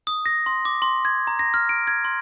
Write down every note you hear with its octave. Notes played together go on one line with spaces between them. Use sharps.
D#6
A#6
C6
D6
C6
G#6
A#5
A#6
F6
D7
G#6
C6